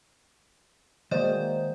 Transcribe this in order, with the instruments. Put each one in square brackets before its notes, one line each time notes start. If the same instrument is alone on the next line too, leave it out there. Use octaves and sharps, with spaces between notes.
[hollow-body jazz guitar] D#3 D5 D#5 [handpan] F#3 G#3 A#3 [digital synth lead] C5